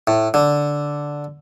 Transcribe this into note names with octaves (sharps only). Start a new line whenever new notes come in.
A2
D3